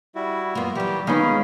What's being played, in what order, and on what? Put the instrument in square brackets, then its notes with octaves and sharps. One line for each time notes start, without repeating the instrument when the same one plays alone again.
[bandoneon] G3 E4 F#4
[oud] F#2 A#3 [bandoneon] B3 F4
[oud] E3 F#3 [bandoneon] G3 G4
[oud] D#3 G#3 [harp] B3 D#4 F4 [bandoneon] C#4 G#4